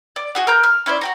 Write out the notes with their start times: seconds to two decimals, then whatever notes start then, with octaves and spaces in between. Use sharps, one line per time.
0.16 D5
0.35 F#4 G#4 F#5
0.47 A#4 A#5 G6
0.63 F6
0.86 C#4 E4 C5 D5
1.01 F#4 G4 A#5